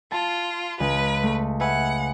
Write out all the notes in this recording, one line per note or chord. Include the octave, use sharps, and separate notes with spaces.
F4 A5
C#2 B4
A3
B4 E5 F#5 G#5